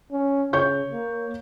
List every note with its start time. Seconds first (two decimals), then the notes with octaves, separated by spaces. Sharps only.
0.12 C#4
0.53 C#3 C#5 C#6 G6
0.92 A#3